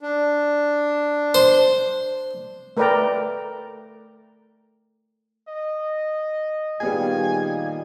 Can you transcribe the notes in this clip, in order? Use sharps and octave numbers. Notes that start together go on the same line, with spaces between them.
D4
C5
A3 A#4 B4 D5 G5 A#5
D#5
A#2 D#3 G3 A#3 B3 G#4 G#5